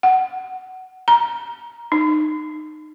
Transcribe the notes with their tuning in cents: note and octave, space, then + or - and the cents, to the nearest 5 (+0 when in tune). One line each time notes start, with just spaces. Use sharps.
F#5 +15
A#5 +15
D#4 -25